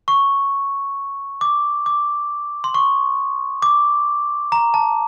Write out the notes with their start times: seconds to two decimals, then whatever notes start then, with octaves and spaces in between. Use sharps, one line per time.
0.08 C#6
1.41 D6
1.86 D6
2.64 C6
2.74 C#6
3.62 D6
4.52 A#5
4.74 A5